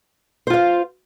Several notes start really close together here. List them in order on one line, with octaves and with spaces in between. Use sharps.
C5 F4 F5